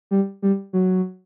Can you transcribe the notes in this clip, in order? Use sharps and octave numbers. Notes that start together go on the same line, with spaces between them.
G3
G3
F#3